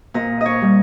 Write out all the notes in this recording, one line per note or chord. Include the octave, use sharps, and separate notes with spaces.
A#2 D#5
C#5 D#5
G3